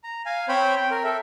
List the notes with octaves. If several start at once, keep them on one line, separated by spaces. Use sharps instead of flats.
A#5
F5 G#5
C4 C5 C#5 G5 B5
G5
A#4
A4 E5